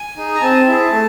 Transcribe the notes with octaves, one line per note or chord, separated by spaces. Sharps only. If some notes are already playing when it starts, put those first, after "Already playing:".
Already playing: G#5
D#4 G#4
A#5
C4 A5
E4 G#4
A3